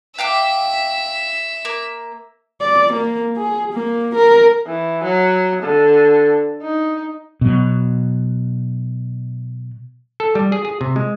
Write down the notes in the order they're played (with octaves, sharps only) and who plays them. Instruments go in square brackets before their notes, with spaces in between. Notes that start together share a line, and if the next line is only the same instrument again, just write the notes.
[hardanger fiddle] E5 [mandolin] F5 G5 D6
[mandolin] A#3
[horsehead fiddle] D5
A#3
G#4
A#3
A#4
[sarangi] E3
F#3
D3
D#4
[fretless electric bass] B2 F#3
[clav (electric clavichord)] A4
G3
G#4
G#4
C3
G#3